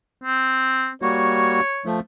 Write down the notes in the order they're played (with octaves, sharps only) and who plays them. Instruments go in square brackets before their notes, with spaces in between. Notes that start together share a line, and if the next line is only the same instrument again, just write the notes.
[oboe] C4
[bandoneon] G3 A#3 F#4 [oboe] C#5
[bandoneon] F3 A3